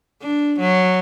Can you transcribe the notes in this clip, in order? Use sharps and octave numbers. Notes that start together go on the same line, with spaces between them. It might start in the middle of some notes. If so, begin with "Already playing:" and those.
D4
F#3